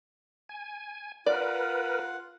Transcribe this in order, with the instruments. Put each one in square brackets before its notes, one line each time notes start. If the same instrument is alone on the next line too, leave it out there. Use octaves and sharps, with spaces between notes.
[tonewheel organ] G#5
[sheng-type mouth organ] F4 F#5 [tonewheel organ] A#4 B4 [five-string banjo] D5